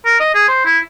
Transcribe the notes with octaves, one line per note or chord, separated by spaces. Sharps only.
A#4
D#5
G#4
C5
E4